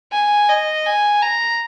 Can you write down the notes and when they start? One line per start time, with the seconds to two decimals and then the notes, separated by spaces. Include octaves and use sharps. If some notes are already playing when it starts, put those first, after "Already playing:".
0.12 G#5
0.49 D#5
0.86 G#5
1.22 A#5